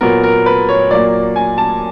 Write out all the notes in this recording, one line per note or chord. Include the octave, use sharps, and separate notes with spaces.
A#2 F#3 B3 A#4
A#4
B4
C#5
A#2 F#3 A#3 D5
G#5
A5